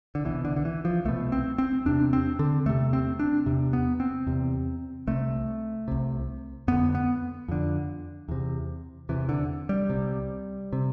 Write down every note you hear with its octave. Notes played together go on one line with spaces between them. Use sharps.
D3
C2 B2 E3
D3
D3
E3
F3
C2 B2 A3
C4
C4
E2 C3 D4
C4
D3
E2 C3 A3
C4
D4
E2 C3
B3
C4
E2 C3
C2 C3 A3
C2 C3
F2 D3 B3
B3
F2 D3
E2 C3
E2 C3 E3
D3
G3
C2 C3
C3